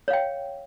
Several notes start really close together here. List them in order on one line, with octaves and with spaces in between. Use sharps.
C#5 F5 G5